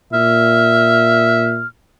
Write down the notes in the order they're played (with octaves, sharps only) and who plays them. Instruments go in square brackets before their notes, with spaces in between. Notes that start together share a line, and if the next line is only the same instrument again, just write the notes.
[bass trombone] A#2 [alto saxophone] E5 [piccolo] F6